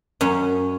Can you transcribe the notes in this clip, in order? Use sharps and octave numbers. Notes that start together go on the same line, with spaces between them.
F#2 C#4